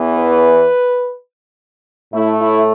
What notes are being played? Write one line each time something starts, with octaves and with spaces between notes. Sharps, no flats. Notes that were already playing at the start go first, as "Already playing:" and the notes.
Already playing: E2 E3 B3
B4
A2 A3 E4
E4